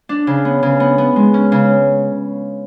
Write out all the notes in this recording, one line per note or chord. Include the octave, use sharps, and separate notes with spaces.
D4
C#3
B3
C#3
B3
B3
G#3
C#4
C#3